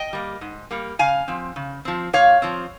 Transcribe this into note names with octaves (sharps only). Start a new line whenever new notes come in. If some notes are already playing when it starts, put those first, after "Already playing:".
Already playing: D#5 G5
G3 A#3
G#2
G3 A#3
C#3 F5 G#5
F3 C4
C#3
F3 C4
A#2 C#5 F5
F3 C4